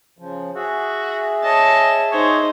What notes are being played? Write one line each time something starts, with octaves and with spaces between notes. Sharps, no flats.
C#3 F3
F#4 G#4 E5
C#5 D#5 A5
D#4 C5 C#5